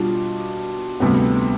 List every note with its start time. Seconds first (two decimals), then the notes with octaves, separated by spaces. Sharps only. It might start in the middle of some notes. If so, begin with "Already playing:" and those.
Already playing: B2 G3 D4 F4
1.00 D2 C3 G3 B3